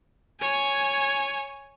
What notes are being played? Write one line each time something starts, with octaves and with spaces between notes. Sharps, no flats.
C#5 G#5